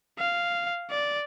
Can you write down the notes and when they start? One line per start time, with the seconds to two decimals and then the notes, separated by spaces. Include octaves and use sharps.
0.19 F5
0.90 D5